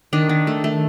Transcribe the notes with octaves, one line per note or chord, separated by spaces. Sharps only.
D#3 D4
D#3
A3
A3